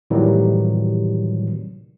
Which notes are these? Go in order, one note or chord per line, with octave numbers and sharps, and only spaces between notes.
A2 C3 D#3 E3 F#3 G3